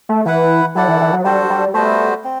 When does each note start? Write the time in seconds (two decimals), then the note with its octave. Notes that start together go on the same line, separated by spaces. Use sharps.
0.09 A3
0.26 E3 E4 B4 F#5
0.75 F#3 E4 A4 D5 F#5
0.88 E3
1.01 E3
1.12 F#3
1.24 G3 D4 F#4 A4 C5
1.50 G3
1.74 G3 A3 B3 F#4 C5
2.24 C4